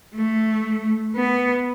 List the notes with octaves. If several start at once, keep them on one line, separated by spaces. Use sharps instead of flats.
A3
B3